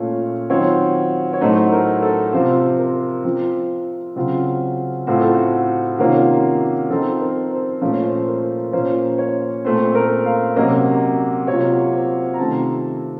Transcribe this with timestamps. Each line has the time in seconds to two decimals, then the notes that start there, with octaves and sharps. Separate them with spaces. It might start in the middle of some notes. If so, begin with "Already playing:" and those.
Already playing: A#2 A3 C#4 F4 C#5
0.50 D#3 F#3 C4 F4 C#5
1.33 C#5
1.41 A2 F#3 A3 D#4 C5
1.72 A#4
2.02 A4
2.33 C3 F3 C4 F4 C5
2.79 A#4
3.24 F3 C4 F4
4.16 C#3 F#3 C4 F4
5.07 A2 A3 C4 F4 F#4
5.21 A4
5.34 F#4
5.98 C3 D#3 A#3 C#4 F4 F#4
6.90 F3 C4 D#4 A4
7.20 A#4
7.51 C5
7.81 A#2 F3 A3 C#4 F4 C5
7.93 C#5
8.04 C5
8.28 A#4
8.73 A#2 F3 A#3 C#4 F4 C5
9.18 C#5
9.65 A#2 A3 C4 C5
9.95 A#4
10.25 F5
10.56 C3 F#3 A#3 C#4 D#5
11.47 C3 F#3 A#3 F4 C#5
11.93 C5
12.34 A#5
12.39 C3 D#3 A3 C4 F4 A5